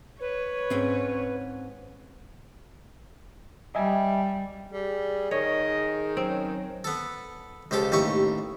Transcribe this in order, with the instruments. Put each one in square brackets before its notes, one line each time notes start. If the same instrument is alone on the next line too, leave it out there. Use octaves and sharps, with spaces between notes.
[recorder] B4 [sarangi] C#5
[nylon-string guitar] G#2 C4 C#4
[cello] G3 [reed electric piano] D#5 E5 G#5
[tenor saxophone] G3 [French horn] G#4
[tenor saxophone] D#3 [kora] C#5 [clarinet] D#5
[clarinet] F#3 [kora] C4 [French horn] C#4
[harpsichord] B3 A4
C#2 F3 G4 A4
A1 D#2 G4 C#6